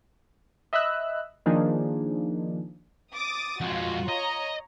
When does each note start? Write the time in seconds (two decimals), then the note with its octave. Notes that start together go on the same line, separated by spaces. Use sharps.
0.73 D#5 E5 B5 E6 F#6
1.46 D#3 F3 A#3 D4 D#4 G#4
3.13 D6 D#6 A6
3.61 F2 G#3 F4 F#4
4.08 C#5 D#5 A#5